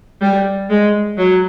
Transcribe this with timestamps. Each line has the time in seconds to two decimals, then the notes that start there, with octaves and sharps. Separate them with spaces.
0.22 G3
0.70 G#3
1.18 F#3